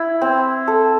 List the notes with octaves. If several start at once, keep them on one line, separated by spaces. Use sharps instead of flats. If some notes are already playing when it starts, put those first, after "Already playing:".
Already playing: E4
C4
A4